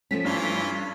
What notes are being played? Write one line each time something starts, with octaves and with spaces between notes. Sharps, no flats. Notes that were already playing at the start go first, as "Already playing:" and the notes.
F3 A3 C#4 B6
G2 E3 F4